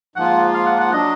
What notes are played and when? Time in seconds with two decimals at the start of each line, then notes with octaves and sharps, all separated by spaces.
0.16 G#2 F3 A#3 F4 F#5
0.54 F5
0.66 F#5
0.80 F#5
0.92 F#3 D4 D#5